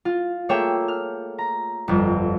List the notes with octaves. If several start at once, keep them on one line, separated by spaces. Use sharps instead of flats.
F4
A3 A#3 G#4 C#5 E5 G5
F6
A#5
G1 F2